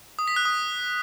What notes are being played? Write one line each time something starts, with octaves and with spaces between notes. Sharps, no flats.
D#6
B6
F#6
D#6